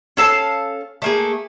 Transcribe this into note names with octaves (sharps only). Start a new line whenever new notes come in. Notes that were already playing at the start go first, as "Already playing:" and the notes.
C#4 A4 F5 A5
A3 A#3 G#4